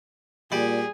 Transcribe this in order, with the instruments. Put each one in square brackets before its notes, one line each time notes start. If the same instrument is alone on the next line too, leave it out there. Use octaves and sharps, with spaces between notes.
[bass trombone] A#2 [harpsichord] G3 [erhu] G#4